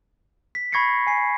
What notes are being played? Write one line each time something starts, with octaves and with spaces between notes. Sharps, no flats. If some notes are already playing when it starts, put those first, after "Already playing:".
B6
B5 C#6 G#6 A#6 C7 C#7
G#5 C7